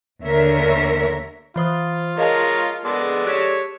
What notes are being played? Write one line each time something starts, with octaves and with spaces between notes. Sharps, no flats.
D#2 D3 A#4 C#5 E5
E3 F4 C5 D#6
G#3 A#4 C#5 D#5 F5 A5 A#5
G#3 B3 G#4 A4 D5 C6
G4 C#5 F#6 B6 E7